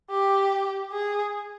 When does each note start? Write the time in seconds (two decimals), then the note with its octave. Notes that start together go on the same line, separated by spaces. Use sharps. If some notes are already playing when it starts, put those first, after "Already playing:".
0.10 G4
0.93 G#4